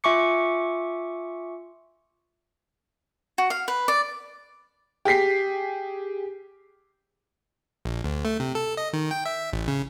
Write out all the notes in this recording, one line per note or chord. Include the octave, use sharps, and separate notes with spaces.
F4 E5 G#5 C#6 D6 C#7
F#4
F5
B4
D5
G4 G#4 B6 C7
A#1
D2
A3
C3
A4
D#5
D#3
G5
E5
A1
C#3